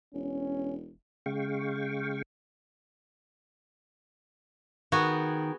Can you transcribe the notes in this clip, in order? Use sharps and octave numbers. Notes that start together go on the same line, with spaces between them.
E1 C#4
C#3 G#3 F5 G5 C#6
D#3 B3 F#4 G#4